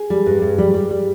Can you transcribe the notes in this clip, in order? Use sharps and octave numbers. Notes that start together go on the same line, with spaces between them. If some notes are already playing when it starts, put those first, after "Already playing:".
Already playing: G#4
G3
G2
G2
G3
G3
G3